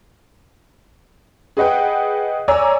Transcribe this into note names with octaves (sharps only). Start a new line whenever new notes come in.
G#4 B4 D#5 F#5 G5
C#5 D5 G#5 A#5 E6